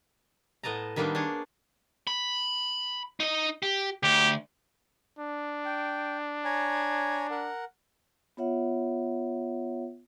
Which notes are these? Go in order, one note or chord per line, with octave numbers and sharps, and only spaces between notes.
A2 B3 D#5 A5 A#5
D#3 G3 A#3 B3 D4 D#4
D4 G#4 C#5
B5
D#4 D#5
G4
D2 G4
D4
G5
C#5 G#5 A#5
A#4 F#5
B3 F4 C#5 E5 F#5